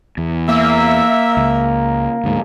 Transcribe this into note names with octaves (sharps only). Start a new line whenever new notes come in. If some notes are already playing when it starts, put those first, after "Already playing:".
E2
A#3 E5
C#2
D2 G#2